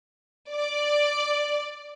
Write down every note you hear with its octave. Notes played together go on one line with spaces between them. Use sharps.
D5